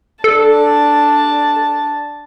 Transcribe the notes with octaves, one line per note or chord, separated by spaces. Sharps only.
D4 A4 A5